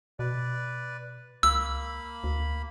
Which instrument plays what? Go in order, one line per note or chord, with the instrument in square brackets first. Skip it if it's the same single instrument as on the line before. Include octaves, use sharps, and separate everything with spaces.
[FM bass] B2 [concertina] B4 D5
[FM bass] C#2 [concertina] A#3 B5 [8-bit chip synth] E6
[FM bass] D2